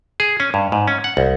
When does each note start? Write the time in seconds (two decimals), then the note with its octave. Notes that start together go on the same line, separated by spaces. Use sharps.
0.20 G#4
0.40 C#4
0.54 G2
0.72 G#2
0.88 C#4
1.04 F#5
1.17 C2